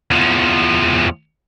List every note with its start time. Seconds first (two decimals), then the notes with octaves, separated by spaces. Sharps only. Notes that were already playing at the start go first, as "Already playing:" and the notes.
0.11 E2 F3